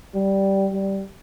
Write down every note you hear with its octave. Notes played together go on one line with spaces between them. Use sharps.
G3
G3